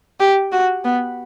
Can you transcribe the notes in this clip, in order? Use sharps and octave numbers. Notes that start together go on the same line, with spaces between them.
G4
F#4
B3